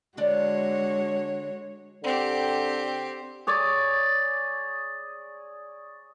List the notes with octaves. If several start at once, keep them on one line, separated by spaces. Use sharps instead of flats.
D3 G#3 D4 F#4 C#5 D5
D3 C4 G4
G#4 C#5 D5